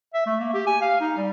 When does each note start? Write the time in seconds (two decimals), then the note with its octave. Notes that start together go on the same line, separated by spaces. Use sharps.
0.14 E5
0.26 A3
0.40 A#3
0.54 G4
0.67 G#5
0.81 F5
1.00 D#4
1.17 G3